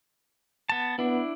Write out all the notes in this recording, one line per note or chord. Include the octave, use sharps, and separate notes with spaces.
B3 A5
B3 D4 E4